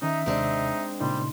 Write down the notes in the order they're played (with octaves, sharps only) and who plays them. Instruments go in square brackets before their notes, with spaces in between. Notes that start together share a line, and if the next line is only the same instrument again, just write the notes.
[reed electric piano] D#3 C#4 [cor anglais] D#4 [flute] E5
[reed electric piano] D#2 C3 [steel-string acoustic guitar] G#3 C4 D4 [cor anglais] D#4
[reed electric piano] A#2 C#3 D#4 [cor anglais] G3 [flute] C6